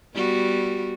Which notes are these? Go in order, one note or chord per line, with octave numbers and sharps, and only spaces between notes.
G3 B3 F#4